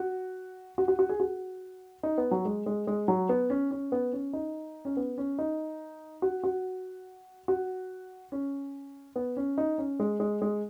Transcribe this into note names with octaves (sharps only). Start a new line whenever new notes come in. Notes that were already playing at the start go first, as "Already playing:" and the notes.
Already playing: F#4
F#4
F#4
F#4
G#4
F#4
D#4
B3
F#3
G#3
G#3
G#3
F#3
B3
C#4
C#4
B3
C#4
D#4
C#4
B3
C#4
D#4
F#4
F#4
F#4
C#4
B3
C#4
D#4
C#4
G#3
G#3
G#3